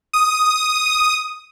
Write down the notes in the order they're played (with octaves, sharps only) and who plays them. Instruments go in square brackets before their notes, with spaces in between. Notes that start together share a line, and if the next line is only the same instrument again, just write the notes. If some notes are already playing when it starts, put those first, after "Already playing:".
[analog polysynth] D#6